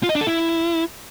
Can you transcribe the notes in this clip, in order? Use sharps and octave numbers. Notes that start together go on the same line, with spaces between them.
F4
D#5
D4
A4
E4